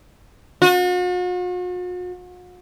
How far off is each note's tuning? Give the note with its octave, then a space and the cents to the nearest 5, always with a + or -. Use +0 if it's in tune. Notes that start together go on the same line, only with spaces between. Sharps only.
F#4 -45